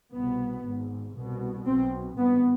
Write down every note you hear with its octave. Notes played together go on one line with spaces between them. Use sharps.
C2 B2 B3
G#1 G#2
C2 B2
B1 B2 C4
G#1 G2 B3